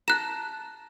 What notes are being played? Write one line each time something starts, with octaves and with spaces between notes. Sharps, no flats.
A5 A#5 F#6 E7